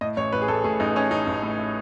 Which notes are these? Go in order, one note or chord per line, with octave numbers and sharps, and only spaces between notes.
A2 D#5
A1 C#5
A1 B4
G#4
A1 A4
A2 G#4
A1 D#4
A2 C#4
A1 D#4
A1
A2
A2